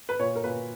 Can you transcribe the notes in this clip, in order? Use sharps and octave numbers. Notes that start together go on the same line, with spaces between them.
B4
A#2 C#5
A#4
A#2 B4